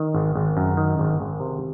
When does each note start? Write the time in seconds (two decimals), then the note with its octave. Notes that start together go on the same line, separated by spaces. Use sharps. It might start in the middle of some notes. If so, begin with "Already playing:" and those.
Already playing: D#3
0.14 G#1
0.35 G#1
0.57 F#2
0.77 D#3
0.99 G#1
1.20 G#1
1.40 C3